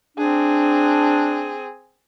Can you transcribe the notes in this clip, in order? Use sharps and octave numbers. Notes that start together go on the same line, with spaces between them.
C4 D4 G#4